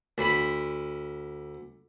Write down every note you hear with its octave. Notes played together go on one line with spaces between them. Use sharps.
D2 B5